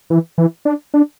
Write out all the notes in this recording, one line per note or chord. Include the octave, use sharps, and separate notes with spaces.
E3
E3
D4
D4